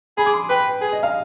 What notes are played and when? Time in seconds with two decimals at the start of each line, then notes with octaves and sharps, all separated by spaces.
0.17 G#4 B5
0.26 D6
0.34 C6
0.49 B4 G5
0.81 G#4
0.92 D#5
1.03 F5